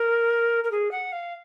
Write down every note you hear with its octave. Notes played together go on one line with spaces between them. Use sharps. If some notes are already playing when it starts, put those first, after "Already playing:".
Already playing: A#4
A#4
G#4
F#5
F5